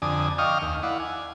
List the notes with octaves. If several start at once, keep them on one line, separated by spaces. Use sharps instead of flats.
F2 D3 D5 G#5 D#6
D#5 F5 G5 C#6 D#6 F6
D#2
E4 D5 F5 F#5
G#5